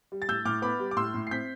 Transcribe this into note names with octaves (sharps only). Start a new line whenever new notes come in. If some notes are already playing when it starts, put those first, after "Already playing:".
G3
A6
A2 E6 G6
A2 D6 F6
B3 B5 D6
G3
D6
A2 C6 E6
A2
C7
C4 G6 B6